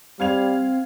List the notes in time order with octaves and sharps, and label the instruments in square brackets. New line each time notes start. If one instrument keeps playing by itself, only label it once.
[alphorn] G3 [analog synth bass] C4 [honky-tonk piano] F5 G#6 F7